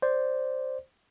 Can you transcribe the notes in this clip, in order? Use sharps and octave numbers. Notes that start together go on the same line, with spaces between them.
C5 D5